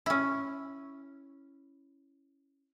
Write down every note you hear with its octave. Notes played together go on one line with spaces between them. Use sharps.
C#4 E4